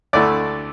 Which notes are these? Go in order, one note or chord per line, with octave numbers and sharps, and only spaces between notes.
D2 D3 A3 E4 D5